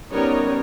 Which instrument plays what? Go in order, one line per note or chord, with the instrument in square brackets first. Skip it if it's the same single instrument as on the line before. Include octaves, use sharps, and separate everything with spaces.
[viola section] G3 B3 D#4 A#4 C#5 [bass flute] C#4